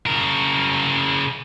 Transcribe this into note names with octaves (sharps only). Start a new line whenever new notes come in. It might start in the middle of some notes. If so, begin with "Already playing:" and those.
C#3 A#4